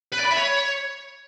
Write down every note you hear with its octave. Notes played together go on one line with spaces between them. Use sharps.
B4
D5
B5
E5
C#5